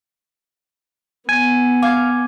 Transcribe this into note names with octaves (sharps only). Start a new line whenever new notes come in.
B3 G#5
F5 D6 G#6